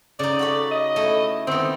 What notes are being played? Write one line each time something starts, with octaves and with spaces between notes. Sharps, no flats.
C#3 D#4 D5
F#4 A4 B5
D#5
A3 E4
D#3 B3 C4